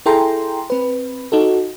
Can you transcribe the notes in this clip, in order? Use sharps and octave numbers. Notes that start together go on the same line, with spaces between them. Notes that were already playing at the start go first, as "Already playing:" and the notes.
E4 G#4 A4 G5 A#5 C6
C4 B4
D#4 F#4 A4